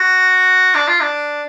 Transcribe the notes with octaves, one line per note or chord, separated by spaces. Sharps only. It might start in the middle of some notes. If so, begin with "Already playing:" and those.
Already playing: F#4
D4
F4
D4